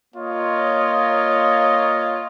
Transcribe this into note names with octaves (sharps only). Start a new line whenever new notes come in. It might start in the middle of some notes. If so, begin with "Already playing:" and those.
A#3 F4 C#5 D#5